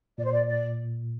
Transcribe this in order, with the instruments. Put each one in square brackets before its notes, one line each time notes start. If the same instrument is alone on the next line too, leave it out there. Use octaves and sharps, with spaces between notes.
[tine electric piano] A#2 [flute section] D5
[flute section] C5
D5
D5